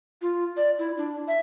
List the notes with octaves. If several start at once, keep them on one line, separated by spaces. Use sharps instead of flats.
F4
D5
E4
D4
E5